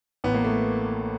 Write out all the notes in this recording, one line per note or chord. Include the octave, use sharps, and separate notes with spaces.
A1 B3
A#3
A3